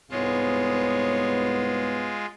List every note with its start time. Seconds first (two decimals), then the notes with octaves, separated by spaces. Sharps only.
0.11 C2 G#2 G#3 B3 F4 C#5